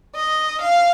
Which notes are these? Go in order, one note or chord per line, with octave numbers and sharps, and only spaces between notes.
D#5
F5